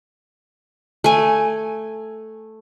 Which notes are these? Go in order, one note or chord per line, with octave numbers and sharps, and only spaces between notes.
A3 G#5